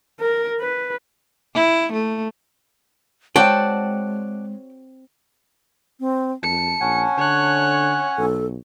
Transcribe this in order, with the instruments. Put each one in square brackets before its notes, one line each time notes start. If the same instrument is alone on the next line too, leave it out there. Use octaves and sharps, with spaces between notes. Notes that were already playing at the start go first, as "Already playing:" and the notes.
[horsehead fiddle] A#4
B4
[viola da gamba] E4
A3
[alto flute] G#3 [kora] C4 F#4 C#5 [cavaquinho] D5 F#5 A5 [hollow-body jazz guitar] G5
[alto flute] C4
[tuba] F2 [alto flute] A5 [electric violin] C#7
[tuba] A#1 [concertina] C#4 F#5 G#5
[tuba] D3 [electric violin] C#5 F#6
[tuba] B1 [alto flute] A4